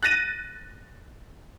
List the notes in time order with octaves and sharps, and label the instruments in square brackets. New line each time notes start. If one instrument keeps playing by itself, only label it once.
[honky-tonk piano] F#6 A6 A#6 D#7